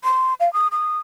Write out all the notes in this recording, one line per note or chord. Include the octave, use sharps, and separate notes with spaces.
C6
F5
D#6
D#6